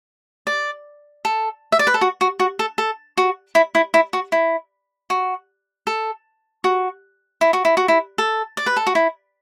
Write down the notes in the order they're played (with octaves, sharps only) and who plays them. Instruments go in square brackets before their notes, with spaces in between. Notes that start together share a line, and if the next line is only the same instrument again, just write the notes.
[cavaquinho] D5
A4
E5
D5
B4
A4
F#4
F#4
F#4
A4
A4
F#4
E4
E4
E4
F#4
E4
F#4
A4
F#4
E4
F#4
E4
F#4
E4
A4
D5
B4
A4
F#4
E4